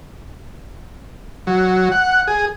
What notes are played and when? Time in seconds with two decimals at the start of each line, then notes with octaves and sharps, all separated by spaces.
1.47 F#3
1.92 F#5
2.28 G#4